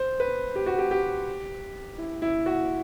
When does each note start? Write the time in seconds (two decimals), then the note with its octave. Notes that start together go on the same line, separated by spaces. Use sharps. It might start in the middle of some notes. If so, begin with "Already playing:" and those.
Already playing: C5
0.20 B4
0.56 G4
0.66 F#4
0.78 G4
0.91 G4
1.98 E4
2.22 E4
2.46 F#4